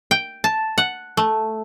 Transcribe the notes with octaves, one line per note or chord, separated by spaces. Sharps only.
G5
A5
F#5
A3